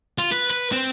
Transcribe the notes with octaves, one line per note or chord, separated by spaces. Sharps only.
F4
B4
B4
C4